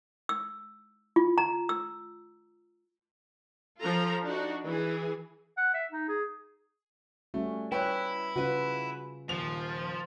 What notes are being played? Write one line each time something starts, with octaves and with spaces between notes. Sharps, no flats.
E6
F4
A#5
E6
F3 F4 A4 A#5
D4 D#4 F#4
E3 G#4
F#5
E5
D#4
G#4
G3 A3 C#4 F#4
E4 B4 C#5 G5
C#3 C#4 F4 F#4 B4
D#1 F3 F7